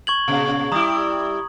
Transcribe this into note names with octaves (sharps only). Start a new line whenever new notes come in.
C#6 G#6 F#7
A#2 C#3
G3 E4 A#5 D#6